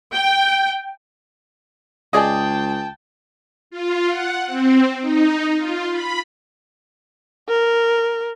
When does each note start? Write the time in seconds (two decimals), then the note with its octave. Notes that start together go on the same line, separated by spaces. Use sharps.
0.13 G5
2.13 C#2 G#4 D5 D#5 G5 A5
3.71 F4
4.09 F#5
4.47 C4
5.01 D#4
5.57 F4
5.91 B5
7.49 A#4